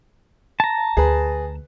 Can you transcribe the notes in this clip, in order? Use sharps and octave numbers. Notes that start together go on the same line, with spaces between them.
A5 A#5
D2 G#4 B4